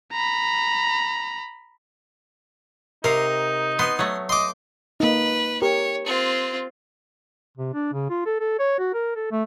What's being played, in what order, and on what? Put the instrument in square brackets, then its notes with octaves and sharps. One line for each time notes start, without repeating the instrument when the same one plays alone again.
[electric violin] A#5 B5
[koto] C3 F5 [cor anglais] D#4 [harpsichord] A#4
[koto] B3 [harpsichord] C6
[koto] F#3 A3
[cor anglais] D#5 [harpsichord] C6 D6
[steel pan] A#3 D#4 [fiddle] B4
[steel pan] G4 A#4 [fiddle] C#5
[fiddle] C4 F4
[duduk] C3
D4
C#3
F4
A4
A4
C#5
F#4
A#4
A4
A3